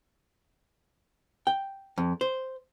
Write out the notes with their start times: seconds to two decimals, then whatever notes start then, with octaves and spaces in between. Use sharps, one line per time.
1.47 G5
1.98 F2
2.21 C5